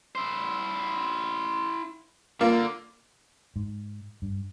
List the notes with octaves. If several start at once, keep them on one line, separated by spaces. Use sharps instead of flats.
E4 C5
D3 A#3 F4 D5
G#2
G2